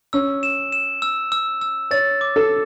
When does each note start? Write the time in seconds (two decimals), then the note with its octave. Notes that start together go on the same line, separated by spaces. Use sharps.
0.13 C#4 E6
0.43 E7
0.72 E7
1.02 E6
1.32 E6
1.61 E6
1.91 C#5 A6
2.21 D6
2.36 A4